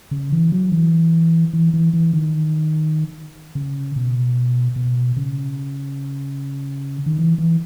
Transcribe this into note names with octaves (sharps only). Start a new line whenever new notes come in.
C#3
E3
F#3
E3
E3
E3
E3
D#3
C#3
B2
B2
C#3
D#3
E3
E3